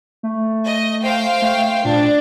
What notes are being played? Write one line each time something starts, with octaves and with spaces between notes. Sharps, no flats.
A3
D#5
C5 F5 G5
A3
A#2 D4